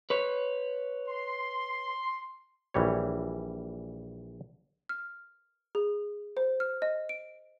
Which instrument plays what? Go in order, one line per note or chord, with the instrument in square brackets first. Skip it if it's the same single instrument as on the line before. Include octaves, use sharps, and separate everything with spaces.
[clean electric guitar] B4 C#5
[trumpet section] C6
[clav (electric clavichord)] A#1 E3 G3 C#5
[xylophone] F6
G#4
C5
F6
D#5
D7